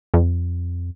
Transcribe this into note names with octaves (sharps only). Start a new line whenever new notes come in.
F2